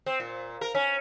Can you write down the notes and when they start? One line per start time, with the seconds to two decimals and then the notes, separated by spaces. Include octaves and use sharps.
0.06 C4
0.20 A#2
0.61 A#4
0.75 C#4